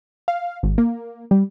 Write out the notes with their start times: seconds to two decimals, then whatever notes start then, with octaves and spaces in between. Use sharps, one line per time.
0.28 F5
0.63 G#1
0.78 A#3
1.31 G3